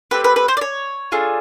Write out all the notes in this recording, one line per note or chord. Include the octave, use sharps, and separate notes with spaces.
A3 C4 G4 B4
B4
B4
C5
D5
C#5
A3 D4 F4 G#4